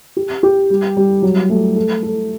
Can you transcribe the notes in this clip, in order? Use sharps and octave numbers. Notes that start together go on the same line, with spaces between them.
G4
G4
G3
G3
F#3
A3
A4
A4